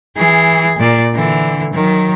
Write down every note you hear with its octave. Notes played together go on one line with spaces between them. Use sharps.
E3 G#4
A#2 D5
D3 E3
D#3 F#3